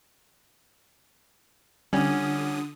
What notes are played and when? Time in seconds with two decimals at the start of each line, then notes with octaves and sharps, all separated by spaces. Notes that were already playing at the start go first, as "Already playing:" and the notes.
1.93 D3 G3 C#4 D4 F4 F#5 D#6